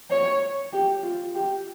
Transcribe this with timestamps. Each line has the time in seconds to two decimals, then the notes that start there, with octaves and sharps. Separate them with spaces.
0.10 C#5
0.72 G4
1.03 F4
1.35 G4